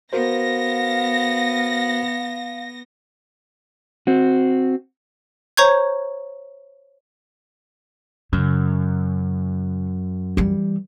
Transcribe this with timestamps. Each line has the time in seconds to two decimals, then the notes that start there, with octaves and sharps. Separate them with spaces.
0.13 B3 F#4 A#4 C5 F5 A#6
4.07 C4 F#4
5.57 C5 C#5 A#5 C#6 G6 G#6
8.33 F#2 C#3
10.37 E3 G3